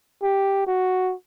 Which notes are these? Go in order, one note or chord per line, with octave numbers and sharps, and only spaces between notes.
G4
F#4